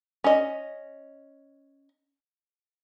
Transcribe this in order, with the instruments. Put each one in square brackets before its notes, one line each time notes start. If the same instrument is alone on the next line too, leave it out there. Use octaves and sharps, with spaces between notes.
[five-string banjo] C#4 D#5